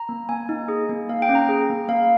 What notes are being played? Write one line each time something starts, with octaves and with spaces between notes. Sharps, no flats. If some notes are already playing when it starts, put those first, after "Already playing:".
Already playing: A#5
A#3
A#3 G#5
D#4
G#4
A#3
A#3 F5
G5
C#4
A#5
G#4
A#3
A#3 F5